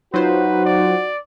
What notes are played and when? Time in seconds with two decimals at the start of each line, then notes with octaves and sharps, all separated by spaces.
0.14 F#3 D#4 F4 F#4 B4 C5
0.65 D5